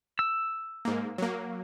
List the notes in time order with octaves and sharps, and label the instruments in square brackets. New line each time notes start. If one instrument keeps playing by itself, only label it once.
[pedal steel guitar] E6
[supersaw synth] G#2 A#3
F#3 A#3